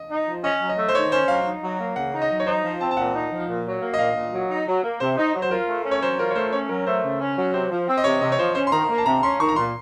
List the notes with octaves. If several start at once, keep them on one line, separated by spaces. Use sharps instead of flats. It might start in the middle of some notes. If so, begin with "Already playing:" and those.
Already playing: D#5
D#4
F3
C#4 D#5
F#3
D#5
A3
C5
D#3 C#5
C#4 C5
F#3 F5
D#4
F#3
A#3
C#3 F#5
D#4
D#5
F#3
C#5
D#4 C5
F3
C4 A5
A5
A#2 F#5
D#4
F3
A#2
F#3
A#3
D#5
A#2 F5
A#2
F#3
D#4
F#3
A#3
C3 C5
D#4
F#3
C5
F4 A#4
A3
C#4
C#5
F#3 C5
F4 A#4
C#5
A3 C5
C#4 C#5
F#3 A#4
A3 C5
C#3
C#4
F#3
C3 C5
F3
C4
D#5
C3 C#5
C3 D#5
C#5
F3 C5
C#4 C5
C6
D#3 A#5
A#3
A5
C3 A#5
C#4 C6
D#3 C#6
A#5
A#2 C6